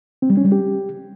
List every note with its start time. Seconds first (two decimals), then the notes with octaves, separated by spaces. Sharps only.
0.22 C4
0.30 G3
0.37 C#4
0.45 G3
0.52 G4